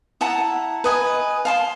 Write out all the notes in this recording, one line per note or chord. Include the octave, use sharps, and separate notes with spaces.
E4 F#5 A5 A#5
B4 D#5 G#5
F5 A5 C6